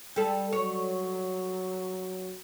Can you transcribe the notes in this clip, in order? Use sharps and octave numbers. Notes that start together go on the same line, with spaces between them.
G3 A4
F#3 C#5